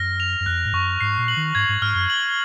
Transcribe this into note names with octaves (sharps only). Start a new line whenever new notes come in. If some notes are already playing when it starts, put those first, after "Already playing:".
Already playing: F#2 F6 A#6
F7
F#2
F2 F#6
G#2
F#2 C#6
G#2 C7
A#2
F#7
D#3
G#2 G#6
G#2
G#2 F6
F#2
F#7